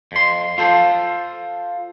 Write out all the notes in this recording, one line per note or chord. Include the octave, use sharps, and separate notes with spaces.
F2 C6
F4 A4 C5